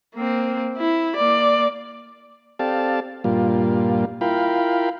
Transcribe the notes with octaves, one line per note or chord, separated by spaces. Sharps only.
A#3 C4
E4
A#3 D5
C4 G4 A4 D5 F5 A5
G2 A#2 G3 A#3 F4
E4 F4 A#4 F5 G5 B5